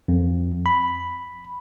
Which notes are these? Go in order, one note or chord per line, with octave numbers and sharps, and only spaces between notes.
F2
B5